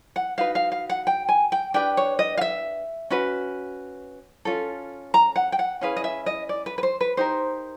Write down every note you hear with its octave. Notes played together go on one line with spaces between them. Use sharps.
F#5
D#4 F#4 B4 F5
F5
F5
F#5
G5
G#5
G5
D4 G4 B4 G5
C#5
D#5
F5
E5
C#4 F#4 B4
C#4 F4 A4
A#5
F#5
G5
F#5
C#4 E4 G#4 B4 F5
D#5
E5
D#5
D5
B4
B4
C5
B4
D#4 G4 A#4 C5